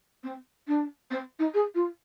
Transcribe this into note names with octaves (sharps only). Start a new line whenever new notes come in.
C4
D4
C4
D#4
G#4
F4